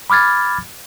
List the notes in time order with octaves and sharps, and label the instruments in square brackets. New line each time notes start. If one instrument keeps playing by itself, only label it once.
[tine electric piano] B5 D6 F6 G#6 A6